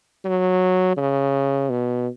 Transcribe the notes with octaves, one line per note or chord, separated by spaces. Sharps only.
F#3
C#3
B2